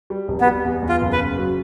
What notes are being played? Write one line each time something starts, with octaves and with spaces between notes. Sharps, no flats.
G3
F1
B3
G3
E2
E2
F4
F#1
B4
C#3
F#3